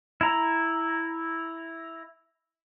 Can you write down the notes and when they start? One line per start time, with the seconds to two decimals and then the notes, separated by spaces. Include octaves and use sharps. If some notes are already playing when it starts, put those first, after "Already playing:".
0.21 E4 A#5